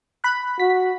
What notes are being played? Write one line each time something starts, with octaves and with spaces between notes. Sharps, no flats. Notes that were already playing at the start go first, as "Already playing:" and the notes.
B5 F#6
F#4 B6